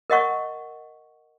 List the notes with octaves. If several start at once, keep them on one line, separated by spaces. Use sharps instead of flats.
A#4 D#5 F#5 C#6